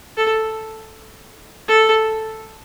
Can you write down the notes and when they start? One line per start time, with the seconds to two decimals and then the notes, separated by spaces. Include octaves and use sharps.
0.17 A4
1.68 A4